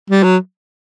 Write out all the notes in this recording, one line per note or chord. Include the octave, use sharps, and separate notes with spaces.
G3
F#3